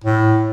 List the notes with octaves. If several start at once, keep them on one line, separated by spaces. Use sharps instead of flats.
A2